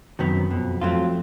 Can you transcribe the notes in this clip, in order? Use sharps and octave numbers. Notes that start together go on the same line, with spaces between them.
F#2 C3 D#3 F#3 B3
F2 B2
F2 F#3 A3 C4 F4